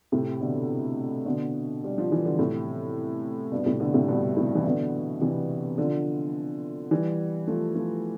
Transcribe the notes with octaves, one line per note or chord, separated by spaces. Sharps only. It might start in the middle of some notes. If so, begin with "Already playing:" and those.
A2 C3
B2 D3
B2 D3
G3
F3
E3
D3
A2 C3
G2 B2
A2 C3
B2 D3
A2 C3
G2 B2
A2 C3
E3
B2 D3
C3 E3
D3 F3
E3 G3
F3 A3
F3 A3